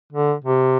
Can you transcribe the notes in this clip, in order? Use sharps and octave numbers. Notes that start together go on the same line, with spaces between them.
D3
C3